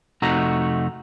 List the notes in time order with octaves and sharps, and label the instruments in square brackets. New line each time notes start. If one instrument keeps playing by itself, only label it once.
[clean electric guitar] F2 C3 A3 D#4 F#4 A#5